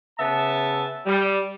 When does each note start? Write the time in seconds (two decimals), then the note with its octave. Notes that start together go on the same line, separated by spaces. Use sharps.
0.19 C#3 B3 E5 A5
1.06 G3